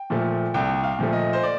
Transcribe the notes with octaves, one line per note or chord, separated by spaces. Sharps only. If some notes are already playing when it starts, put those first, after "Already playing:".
Already playing: G5
A#2 F3 A3
C2 G5
F5
A#2 F3 A3
D#5
C5
D5